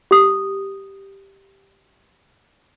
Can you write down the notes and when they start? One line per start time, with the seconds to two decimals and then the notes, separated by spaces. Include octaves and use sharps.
0.11 G4 D#6